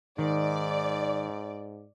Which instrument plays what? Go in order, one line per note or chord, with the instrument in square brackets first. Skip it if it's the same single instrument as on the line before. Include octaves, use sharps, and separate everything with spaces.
[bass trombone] G#2 [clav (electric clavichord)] D#3 [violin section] D5